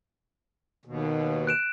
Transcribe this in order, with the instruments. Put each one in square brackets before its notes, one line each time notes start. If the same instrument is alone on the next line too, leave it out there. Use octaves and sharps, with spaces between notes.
[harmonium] D#2 B2
[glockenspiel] F#6 D7 E7